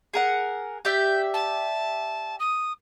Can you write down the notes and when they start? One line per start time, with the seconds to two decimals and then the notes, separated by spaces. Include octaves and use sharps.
0.14 G#4 A#4 F#5
0.85 G4 D5 E5 G6
1.33 A5
2.39 D#6